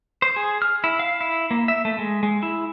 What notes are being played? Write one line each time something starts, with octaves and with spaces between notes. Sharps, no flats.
C5
G#4
F6
E4
F5
E4
A#3
E5
A3
G#3
G#3
E4